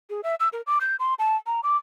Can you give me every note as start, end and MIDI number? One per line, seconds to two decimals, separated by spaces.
0.10 0.21 68
0.24 0.35 76
0.40 0.49 88
0.53 0.61 70
0.67 0.79 86
0.81 0.96 91
0.99 1.14 84
1.19 1.36 81
1.46 1.61 82
1.63 1.77 86